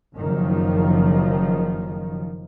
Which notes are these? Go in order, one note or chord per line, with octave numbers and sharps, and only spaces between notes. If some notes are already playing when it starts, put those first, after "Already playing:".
F#1 D#3 F3